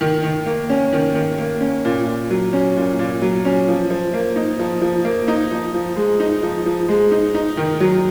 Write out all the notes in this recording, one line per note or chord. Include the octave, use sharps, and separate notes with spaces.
D#3
D#3
A#3
C#4
D#3
D#3
A#3
C#4
A#2
A#2
F#3
C#4
A#2
A#2
F#3
C#4
F3
F3
A#3
D#4
F3
F3
A#3
D#4
F3
F3
G#3
D#4
F3
F3
G#3
D#4
D#4
D#3
F#3